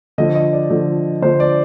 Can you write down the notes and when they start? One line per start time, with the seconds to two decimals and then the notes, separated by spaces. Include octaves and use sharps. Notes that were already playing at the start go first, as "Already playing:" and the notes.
0.18 D3 F3 D#5
0.35 D#5
0.53 D5
0.70 D3 F3
1.22 D3 F3 C5
1.40 D5